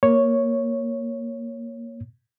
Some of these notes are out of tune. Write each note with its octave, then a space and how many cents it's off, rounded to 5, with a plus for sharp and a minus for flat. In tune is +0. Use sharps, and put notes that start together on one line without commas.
A#3 +5 C#5 +0